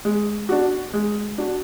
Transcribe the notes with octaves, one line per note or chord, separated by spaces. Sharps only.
G#3
D4 F#4
G#3
D4 F#4